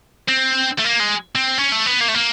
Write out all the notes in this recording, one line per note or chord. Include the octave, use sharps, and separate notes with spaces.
C4
A3
A#3
G#3
C4
C#4
A3
B3
A#3
A3
A#3